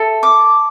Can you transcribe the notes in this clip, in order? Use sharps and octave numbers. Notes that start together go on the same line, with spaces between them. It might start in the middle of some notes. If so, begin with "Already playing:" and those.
Already playing: A4 E5
D6